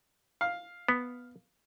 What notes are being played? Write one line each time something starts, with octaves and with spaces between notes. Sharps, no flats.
F5
B3